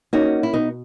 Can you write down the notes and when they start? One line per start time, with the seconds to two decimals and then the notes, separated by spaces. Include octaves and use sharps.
0.13 A#3 C#4 D#4 F#4
0.43 E4
0.53 B2 B3 D#4